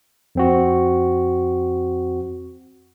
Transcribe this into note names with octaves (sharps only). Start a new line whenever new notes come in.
F2 C4 F#4